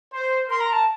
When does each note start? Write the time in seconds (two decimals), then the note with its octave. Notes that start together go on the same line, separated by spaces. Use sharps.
0.12 C5
0.49 A#4 C6
0.60 A#5
0.72 A5